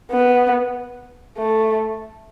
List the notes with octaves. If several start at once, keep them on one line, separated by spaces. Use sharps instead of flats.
B3
A3